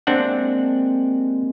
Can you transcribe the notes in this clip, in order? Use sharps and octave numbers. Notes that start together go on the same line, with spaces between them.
C3 G#3 A#3 C4 D4 F#5